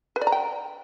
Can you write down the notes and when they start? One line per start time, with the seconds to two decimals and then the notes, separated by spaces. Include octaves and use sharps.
0.16 B4
0.21 D5
0.27 A#5
0.32 G5